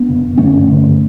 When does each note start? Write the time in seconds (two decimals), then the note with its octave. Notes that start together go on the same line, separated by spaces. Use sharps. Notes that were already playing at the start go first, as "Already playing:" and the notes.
Already playing: B3 D4
0.08 F#2 C#3
0.38 G2 D3 A3 C#4
0.67 G2 D3